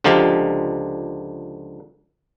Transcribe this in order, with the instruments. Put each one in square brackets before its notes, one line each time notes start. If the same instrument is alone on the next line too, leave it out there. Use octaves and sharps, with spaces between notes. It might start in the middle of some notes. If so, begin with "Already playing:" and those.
[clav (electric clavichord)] C#2 D3 F3 D#4 G4 F5